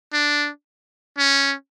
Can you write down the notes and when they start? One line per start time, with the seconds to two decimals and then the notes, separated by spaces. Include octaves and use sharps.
0.13 D4
1.18 C#4